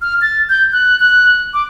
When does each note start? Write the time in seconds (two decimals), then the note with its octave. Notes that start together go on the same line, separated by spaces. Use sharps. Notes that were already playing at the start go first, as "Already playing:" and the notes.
0.02 F6
0.22 A6
0.49 G6
0.73 F#6
1.00 F#6
1.54 D6